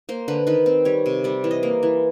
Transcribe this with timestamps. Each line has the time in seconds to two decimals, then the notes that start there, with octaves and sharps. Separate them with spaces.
0.09 A#3 C5
0.28 D3 B4
0.47 D#3 B4
0.66 C4
0.85 G3 C#5
1.06 C3
1.24 G3 D5
1.44 E3
1.51 D#5
1.63 A#3
1.83 E3